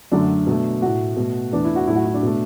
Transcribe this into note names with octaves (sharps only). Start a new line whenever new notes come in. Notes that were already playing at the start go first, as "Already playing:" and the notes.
F#2 D3 F#3 A3 D4
B2 A3
A2 A3 F#4
B2 A3
E2 E3 A3 D4
E4
F#4
A2 F#3 A3 E4
F#4
E4
D4
B2 A3